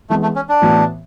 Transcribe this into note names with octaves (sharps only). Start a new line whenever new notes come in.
E3 G#3 A3 B3
A3
C#4
D4
A2 E3 B3 F#4